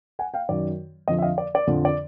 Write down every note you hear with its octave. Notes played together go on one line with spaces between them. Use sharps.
F#5 G#5
F5 G5
F#2 D#3 D5
F2 D3 F3 D#5
E5
D#5 F5
D5
D5
F2 D3 F3
D5